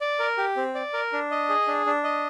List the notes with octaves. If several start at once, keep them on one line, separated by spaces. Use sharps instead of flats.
D5
A#4
G4
C4
D5
A#4
D4
D#5
G#4
D4
D4
D#5